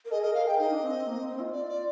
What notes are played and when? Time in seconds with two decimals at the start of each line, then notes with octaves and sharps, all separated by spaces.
0.05 A#4
0.11 G#4 D#5
0.23 A#4 D#5
0.34 A#4 F5
0.47 G#4 G5
0.59 D#4 D#5
0.71 D4
0.82 C4
0.94 C4
1.06 A#3
1.17 C4
1.29 C4
1.41 F4
1.52 D5
1.68 D5